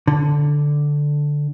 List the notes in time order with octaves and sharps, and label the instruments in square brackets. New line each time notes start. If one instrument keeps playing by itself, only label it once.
[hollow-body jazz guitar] D3